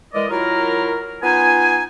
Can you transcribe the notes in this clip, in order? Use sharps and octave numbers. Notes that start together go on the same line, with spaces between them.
E3 G#3 A#4 D5 D#5
F#3 E4 F4 A#4
B3 D#4 F4 G#5